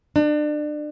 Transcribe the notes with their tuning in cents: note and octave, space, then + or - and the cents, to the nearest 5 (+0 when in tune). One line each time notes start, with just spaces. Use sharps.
D4 +30